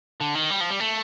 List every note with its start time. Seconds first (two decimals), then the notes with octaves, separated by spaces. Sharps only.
0.21 D3
0.35 D#3
0.50 G3
0.61 F3
0.70 G3
0.80 A3